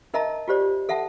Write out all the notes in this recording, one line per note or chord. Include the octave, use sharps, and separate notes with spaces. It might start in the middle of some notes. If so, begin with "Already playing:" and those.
D#4 A#4 D#5 E5 A5 A#5
F4 G4 C5 D5
A4 E5 F#5 A5